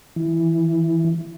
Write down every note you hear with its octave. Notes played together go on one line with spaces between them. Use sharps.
E3